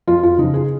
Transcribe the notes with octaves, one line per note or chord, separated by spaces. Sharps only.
F2 F4
F4
C#3 F3 D#4
G#4